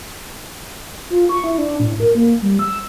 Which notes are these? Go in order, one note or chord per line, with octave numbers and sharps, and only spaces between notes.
F4
C#6
E4
D4
A2
A#4
A#3
G3
E6